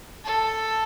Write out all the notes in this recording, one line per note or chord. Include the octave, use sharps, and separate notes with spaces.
A4